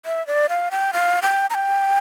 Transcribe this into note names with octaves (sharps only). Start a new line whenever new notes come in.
E5
D5
F5
G5
F5
G5
A#5
G5